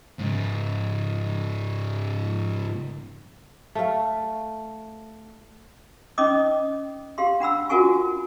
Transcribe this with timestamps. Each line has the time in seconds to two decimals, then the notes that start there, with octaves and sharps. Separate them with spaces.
0.19 G#2 C#3
3.75 A3 F5
6.18 C#4 D#4 D#5 D6 D#6
7.18 G4 F5 C6
7.40 D4 F#5 B5 E6
7.69 F4 F#4 A#4 F#5 G#5 C#6